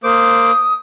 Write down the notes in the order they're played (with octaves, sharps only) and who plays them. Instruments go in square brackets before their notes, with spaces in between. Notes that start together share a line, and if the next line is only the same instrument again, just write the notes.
[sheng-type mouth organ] A#3 C5 D6 [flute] D#6